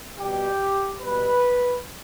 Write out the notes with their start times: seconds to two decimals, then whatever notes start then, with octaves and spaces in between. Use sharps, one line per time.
0.18 B2 G3 G4
1.00 B2 G3 B4